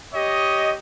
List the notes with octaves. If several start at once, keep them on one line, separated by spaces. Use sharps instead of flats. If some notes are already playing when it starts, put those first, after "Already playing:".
G4 C#5 D#5